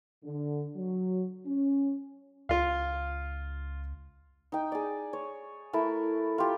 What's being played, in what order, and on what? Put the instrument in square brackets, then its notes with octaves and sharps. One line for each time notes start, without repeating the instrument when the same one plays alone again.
[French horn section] D3
F#3
C#4
[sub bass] C#2 [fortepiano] F4 F5
[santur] D#4 G5
G#4 D5
C#5
A3 E4 A4 A#4
F4 G4